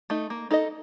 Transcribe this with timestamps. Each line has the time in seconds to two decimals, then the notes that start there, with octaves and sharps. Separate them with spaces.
0.10 A3 D#4
0.30 A#3
0.51 D#4 A4 D#5